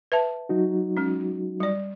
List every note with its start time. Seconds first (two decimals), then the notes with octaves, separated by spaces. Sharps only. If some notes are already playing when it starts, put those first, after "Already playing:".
0.12 B4 E5 A5
0.49 F#3 D#4 F#4
0.97 G#3 C#4
1.60 G3 D5